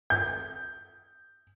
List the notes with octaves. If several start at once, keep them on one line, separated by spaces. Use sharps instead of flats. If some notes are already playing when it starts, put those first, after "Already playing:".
G6